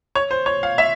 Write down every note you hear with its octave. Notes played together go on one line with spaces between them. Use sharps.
C#5
C5
C#5
F5
E5